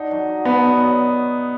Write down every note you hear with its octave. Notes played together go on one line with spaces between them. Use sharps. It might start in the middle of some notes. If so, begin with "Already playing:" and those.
Already playing: D4 D#4 F#4
F#3
F#4
B3 D4
F#3
F#3